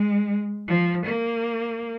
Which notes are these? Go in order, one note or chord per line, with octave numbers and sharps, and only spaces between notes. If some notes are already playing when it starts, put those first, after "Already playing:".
Already playing: G#3
F3
A#3